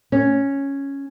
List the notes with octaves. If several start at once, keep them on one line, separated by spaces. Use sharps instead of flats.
C#4